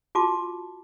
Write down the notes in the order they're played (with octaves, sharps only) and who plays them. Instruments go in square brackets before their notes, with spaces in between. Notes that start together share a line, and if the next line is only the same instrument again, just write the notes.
[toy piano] F4 F#4 A5 D6